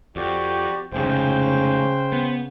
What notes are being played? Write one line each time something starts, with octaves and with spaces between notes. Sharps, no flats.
F2 F#4 G4 D5
F1 G#2 C#3 C5 G5
B3